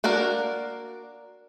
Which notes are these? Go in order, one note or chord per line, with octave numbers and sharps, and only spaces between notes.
A#3 D4 F#4 A#4